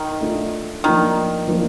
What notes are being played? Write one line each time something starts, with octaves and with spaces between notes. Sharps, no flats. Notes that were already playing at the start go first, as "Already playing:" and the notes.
Already playing: D#3
A3 D4 F4
D#3 F3 A#3 D4 F4
F3 A#3 D4 F4